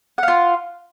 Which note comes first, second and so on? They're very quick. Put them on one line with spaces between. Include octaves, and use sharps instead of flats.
F#5 F5 F4